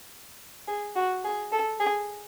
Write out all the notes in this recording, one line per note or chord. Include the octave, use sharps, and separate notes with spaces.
G#4
F#4
G#4
A4
G#4